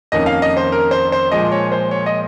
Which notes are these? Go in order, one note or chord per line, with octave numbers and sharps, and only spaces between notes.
F2 D#3 A#3 C#4 D#5
F5
D#5
C5
A#4
C5
C5
A#2 F3 G#3 D#5
C#5
C5
C#5
D#5